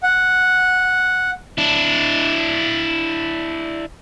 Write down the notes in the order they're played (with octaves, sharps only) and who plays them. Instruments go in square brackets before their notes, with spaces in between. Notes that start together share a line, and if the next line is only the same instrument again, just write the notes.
[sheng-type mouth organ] F#5
[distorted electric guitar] D4 E4